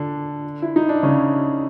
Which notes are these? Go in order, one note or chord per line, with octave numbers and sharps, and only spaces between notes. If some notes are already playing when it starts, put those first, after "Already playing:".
Already playing: D3 D4
E4
D#4
D4
C#3 C#4